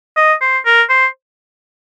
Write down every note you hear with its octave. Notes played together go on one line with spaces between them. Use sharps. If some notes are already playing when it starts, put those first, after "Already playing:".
D#5
C5
A#4
C5